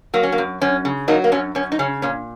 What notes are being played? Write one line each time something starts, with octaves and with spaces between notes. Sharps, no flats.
F#3 A#3
C#4
A#3
F#2
F#2 C#4
C#3
F#3 A#3 D#4
A#3
F#2 C#4
F#2 C#4
D#4
C#3 C#4
A#2 C#4